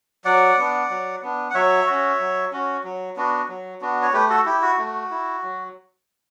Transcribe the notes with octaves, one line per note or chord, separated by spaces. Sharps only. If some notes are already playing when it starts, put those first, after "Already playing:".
F#3 D5 F#5
B3 D4
F#3
B3 D4
F#5
F#3 C#5 E5
C#4 F#4
F#3
C#4 F#4
F#3
B3 D4 F#4
F#3
B3 D4 F#4
C#5
A3 G4 B4
F#4 A4
E4 G4
F#4
A3
E4
F#3